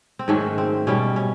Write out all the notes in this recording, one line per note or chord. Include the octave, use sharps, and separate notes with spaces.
C4
G#2 D#3 F#3 A3 C#4
C4
B2 G3 C#4
C#4